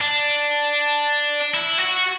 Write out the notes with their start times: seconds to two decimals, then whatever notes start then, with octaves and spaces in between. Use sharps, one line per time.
0.01 D4
1.54 E4
1.79 F#4